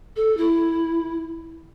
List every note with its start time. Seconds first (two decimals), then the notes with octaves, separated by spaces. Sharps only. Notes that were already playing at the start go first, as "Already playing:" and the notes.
0.16 A4
0.37 E4